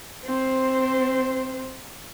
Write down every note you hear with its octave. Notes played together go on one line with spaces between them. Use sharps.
C4 C5